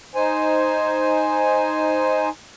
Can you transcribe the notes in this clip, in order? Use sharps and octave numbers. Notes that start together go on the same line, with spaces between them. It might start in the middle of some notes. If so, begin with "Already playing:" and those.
D#4 C5 G#5